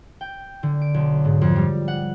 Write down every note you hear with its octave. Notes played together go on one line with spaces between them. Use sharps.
G5
D3
D7
B1
G#2
F2
G3
F#5